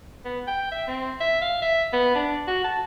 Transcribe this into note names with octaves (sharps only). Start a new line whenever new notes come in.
B3
G5
E5
C4
E5
F5
E5
B3
D4
F#4
A5